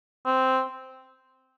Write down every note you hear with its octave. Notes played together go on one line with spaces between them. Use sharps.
C4